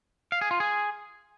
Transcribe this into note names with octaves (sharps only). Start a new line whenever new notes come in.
F5
G#4
F4
G#4